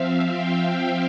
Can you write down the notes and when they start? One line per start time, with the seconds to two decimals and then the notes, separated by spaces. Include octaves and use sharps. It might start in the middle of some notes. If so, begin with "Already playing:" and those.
Already playing: F3 C4 E5 F5
0.30 G5
0.76 G5